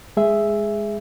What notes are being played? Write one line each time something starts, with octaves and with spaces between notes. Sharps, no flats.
G#3 G#4 E5